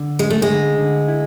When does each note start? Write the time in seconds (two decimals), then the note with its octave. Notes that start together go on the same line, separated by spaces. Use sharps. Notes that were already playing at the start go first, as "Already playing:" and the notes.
Already playing: D3
0.19 G#3 C#4
0.30 A3
0.42 G#3
0.49 D3
0.79 D3
1.08 E4